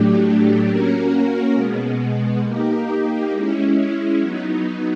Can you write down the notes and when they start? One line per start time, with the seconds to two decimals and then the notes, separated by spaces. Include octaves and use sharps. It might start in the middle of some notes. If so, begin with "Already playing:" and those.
Already playing: A2 F#3 A3 D4 G4
0.66 A#3 C#4 F#4 A#4
1.54 B2 G#3 B3
2.42 A#3 D#4 G4
3.30 G#3 C#4 E4
4.19 F#3 B3 D#4